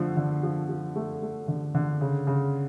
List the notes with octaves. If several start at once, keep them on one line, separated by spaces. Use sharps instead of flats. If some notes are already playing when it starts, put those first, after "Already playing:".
Already playing: D3 F3 A3
D3
F3
F3
A3
A3
D3
D3
C#3
C#3